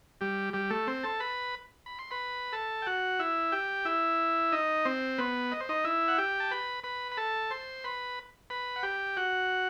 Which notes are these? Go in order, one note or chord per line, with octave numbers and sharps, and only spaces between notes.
G3 G4
G3 G4
A3 A4
C4 C5
A4 A5
B4 B5
B5
C6
B4 B5
A4 A5
G5
F#4 F#5
E4 E5
G4 G5
E4 E5
D#4 D#5
C4 C5
B3 B4
D#5
C5
D#4 D#5
E4 E5
F#5
G4 G5
A5
B4 B5
B4 B5
B5
A4 A5
C5 C6
B4 B5
B4 B5
F#5
G4 G5
F#4 F#5